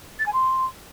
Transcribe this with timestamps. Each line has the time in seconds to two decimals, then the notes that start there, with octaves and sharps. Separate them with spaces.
0.19 A6
0.26 G#5
0.33 C6